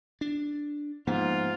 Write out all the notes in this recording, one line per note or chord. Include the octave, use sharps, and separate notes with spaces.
D4
G#2 F3 A#3 B3 F4